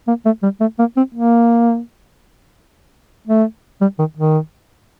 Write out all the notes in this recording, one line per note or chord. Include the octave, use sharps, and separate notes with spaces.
A#3
A3
G3
A3
A#3
C4
A#3
A3
G3
D#3
D#3